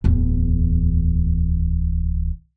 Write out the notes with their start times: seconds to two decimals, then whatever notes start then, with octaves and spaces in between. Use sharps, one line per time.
0.04 D1 E2